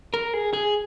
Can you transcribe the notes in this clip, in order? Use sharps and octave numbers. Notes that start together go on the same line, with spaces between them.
A#4
G#4
G#4